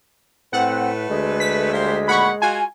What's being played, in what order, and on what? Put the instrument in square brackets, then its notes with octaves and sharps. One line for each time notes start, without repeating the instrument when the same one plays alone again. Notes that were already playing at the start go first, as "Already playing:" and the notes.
[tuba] A2 [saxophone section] A3 B4 [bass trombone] C4 [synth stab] F#5
[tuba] D2 [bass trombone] G#3
[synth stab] B6
[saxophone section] G3 A#3 C5
[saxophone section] A#2 D#3 F#5 [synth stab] B5 C#6
[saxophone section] F4 F#4 [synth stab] G#5